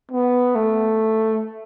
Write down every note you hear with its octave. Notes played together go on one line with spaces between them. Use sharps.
B3
A3